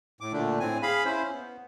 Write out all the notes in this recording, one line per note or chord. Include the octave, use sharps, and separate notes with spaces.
A2 D6
A#2 D3 A3 D4
A2 C4 G#5
G#4 F5 B5
C#4 E4 C5
B3